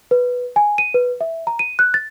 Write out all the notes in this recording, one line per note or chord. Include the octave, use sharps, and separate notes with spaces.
B4
G#5
D#7
B4
E5
A#5
D#7
F#6
A6